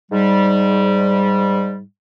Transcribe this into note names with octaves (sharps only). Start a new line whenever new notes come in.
G#2 G3